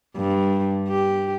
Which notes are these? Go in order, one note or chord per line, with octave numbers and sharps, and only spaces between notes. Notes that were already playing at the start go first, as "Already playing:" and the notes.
G2
G4